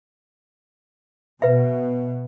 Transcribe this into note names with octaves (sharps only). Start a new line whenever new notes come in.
B2 B4 E5